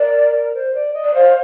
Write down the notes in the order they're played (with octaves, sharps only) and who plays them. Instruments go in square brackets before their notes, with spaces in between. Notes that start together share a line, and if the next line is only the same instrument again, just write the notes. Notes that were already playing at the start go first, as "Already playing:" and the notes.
Already playing: [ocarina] A#4 [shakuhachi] D5
[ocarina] C5
D5
D#5
[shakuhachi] D5
[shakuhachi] C5 [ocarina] F5